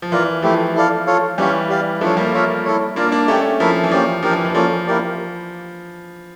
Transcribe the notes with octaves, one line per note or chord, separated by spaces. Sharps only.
F3
E3 F4 A#4 D5
F3 A3 E4 G4
E4 A4 D5 F5
F4 A4 C#5 F5
E3 G3 C#4 G4 C#5 F5
G4 D5 F5
F3 A3 D4 F4 A4 C#5
G3 A#3
F4 A#4 C#5 E5
E4 A4 C#5
A#3 D4 F4 A#4 D5
A#3 D4
A3 A#3 C#4 D4 G4 D5 G5
F3 A3 E4 A#4 E5
E3
F3 A#3 C#4 G4 D5
F3 D4 G4 A#4 D5
E3
E3
F3 A#3 C#4 F4 A4 D5
A#3 E4 G4 A#4 D5